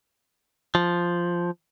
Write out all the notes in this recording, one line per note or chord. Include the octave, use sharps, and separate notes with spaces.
F3